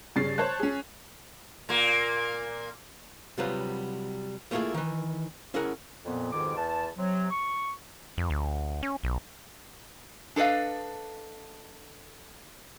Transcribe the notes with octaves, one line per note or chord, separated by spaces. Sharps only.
G2 C#3 C#4 A6 C7
C5 C#5 A5 F#6
C#4 G#4
A#2 A#3
C3 F#3 G3 F4 B4
G3 A3 A#3 E4 F4 G#4
D#3 E3
C#4 E4 G#4 A#4 F#5
F2 A#2 B3
F2 G#2 B2 D#3 D6
E2 A5
C3 F#3
C#6
F2
D2
C#4
B1
D4 A4 B4 D#5 F5